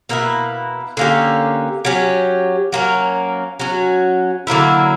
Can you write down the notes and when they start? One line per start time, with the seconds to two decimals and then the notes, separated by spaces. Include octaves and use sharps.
0.09 B2 A#3 E4 B4
0.97 D3 A#3 C#4 G4
1.85 F#3 C#4 G4
2.72 F#3 A#3 C#4
3.60 F#3 C#4 F#4
4.47 D3 F#3 A#3 E4